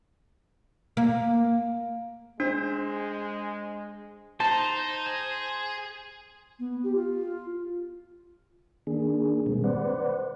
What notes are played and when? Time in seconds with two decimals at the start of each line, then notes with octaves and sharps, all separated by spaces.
0.97 A#3
2.40 G#3 D4 C5
4.40 D#4 C5 A5
5.06 G#4
6.59 B3
6.83 G4
6.95 F4
8.87 D#3 A#3 D4 G#4
9.46 B2 D#3 G3 G#3 A#3 C4
9.64 B4 C5 D5 F#5